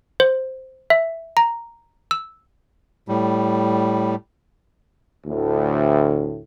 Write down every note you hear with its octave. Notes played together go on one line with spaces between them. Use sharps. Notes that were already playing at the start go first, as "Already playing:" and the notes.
C5
E5
A#5
E6
A2 G3
D2 A2